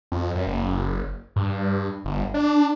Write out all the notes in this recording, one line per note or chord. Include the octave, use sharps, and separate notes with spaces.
F2
F#2
F#1
G2
G1
D4